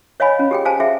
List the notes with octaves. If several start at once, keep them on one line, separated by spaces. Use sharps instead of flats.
C#5 D#5 F5 G#5 B5
C#4
G4 G#4 G5
G#4 C5 F5 G#5 A5
G#4 E5 G5